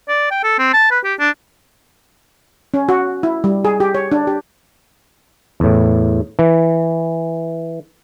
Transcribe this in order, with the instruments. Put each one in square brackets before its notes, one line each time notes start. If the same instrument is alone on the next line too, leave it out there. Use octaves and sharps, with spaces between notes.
[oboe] D5
G5
A4
C4
A5
B4
G4
D4
[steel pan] C#4
F#4
E4
G3
G#4
G4
C#5
D4
G4
[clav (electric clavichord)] E2 A2
E3